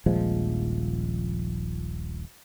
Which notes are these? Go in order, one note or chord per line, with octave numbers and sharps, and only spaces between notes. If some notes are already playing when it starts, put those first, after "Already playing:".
D#1 A#1 F3 G#3